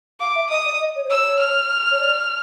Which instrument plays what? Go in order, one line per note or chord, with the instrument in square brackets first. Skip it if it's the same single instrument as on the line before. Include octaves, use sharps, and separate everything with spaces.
[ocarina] F5 [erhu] D6
[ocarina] E5
[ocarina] D#5 [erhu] D#6
[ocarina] D5
D#5
C#5
C5
[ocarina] C#5 [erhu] E6
[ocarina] C#5
[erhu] F6
[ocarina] C#5
D5